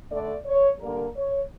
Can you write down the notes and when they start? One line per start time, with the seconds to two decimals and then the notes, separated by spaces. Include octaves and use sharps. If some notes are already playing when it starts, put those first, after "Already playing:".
0.10 D3 A3 D4 D5
0.45 C#5
0.81 D3 G3 A#3 A#4
1.16 C#5